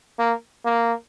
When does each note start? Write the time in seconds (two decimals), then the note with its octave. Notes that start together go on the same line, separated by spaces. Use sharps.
0.19 A#3
0.65 A#3